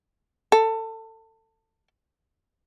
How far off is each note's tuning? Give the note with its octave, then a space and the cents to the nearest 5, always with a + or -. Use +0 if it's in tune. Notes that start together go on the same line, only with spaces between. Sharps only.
A4 +25